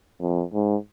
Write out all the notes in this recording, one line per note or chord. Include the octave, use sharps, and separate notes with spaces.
F2
G#2